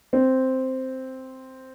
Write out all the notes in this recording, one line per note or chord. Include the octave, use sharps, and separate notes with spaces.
C4